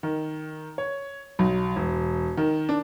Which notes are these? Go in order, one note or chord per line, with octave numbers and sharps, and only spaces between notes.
D#3
C#5
B1
E1
D#3
D4